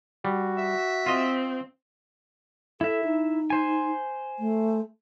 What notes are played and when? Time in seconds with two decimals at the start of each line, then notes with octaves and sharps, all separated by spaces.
0.25 G3 F#4
0.58 E5
1.06 C4 F4 D#5
2.81 E4 A4 E5
3.04 D#4
3.50 C5 G#5
4.39 A3